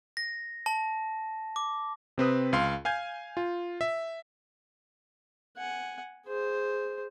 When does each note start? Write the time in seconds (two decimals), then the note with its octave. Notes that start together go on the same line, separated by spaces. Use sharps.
0.17 A#6
0.66 A5
1.56 D6
2.18 C3 C4 B4 D#6
2.53 C#2 F5 C6
2.85 F5 G#5 G6 G#6
3.37 F4
3.81 E5
5.57 F#5 G#5
6.26 G#4 C5